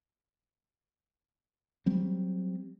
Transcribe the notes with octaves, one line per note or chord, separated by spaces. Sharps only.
F#3 G3 C4